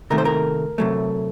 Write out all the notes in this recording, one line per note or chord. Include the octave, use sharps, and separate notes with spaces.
C3 D#3 A3 A#4
C5
A#4
C3 F#3 A3